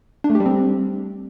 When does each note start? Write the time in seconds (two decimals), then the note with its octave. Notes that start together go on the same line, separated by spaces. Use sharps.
0.24 D4
0.30 A3
0.35 G4
0.40 G3
0.46 C4